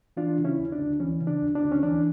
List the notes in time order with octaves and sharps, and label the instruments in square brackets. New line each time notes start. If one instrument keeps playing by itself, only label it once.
[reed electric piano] E3 D4 F4
C#3
C#4 E4
D2
D4
D2
E3 C#4
C#3
D4
D2
D4
D2
C#4
E3 D4